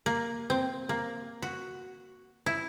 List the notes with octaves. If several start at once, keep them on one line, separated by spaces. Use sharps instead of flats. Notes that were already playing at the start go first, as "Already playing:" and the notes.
A#3
C4
A#3
F#4
E4